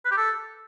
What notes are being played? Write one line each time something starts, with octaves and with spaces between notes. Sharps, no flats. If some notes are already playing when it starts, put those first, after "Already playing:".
B4
G4
A4